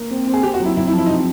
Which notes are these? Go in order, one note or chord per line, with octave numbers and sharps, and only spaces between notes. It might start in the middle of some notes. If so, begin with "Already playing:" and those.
Already playing: A#3
C4
C4
G#4
C4 G4
F#4
F#3
E4
C3 E4
E4
F3
E4
D#4
C3